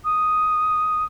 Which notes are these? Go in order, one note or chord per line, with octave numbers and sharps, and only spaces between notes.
D#6